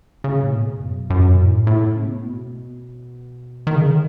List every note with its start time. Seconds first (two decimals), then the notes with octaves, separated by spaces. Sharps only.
0.24 C#3
0.43 A2
0.52 B2
0.81 F#2
1.10 F#2
1.34 B2
1.39 A2
1.67 A2
1.96 C#3
2.05 B2
2.16 A2
2.26 B2
3.67 D#3
3.75 C#3
3.83 D#3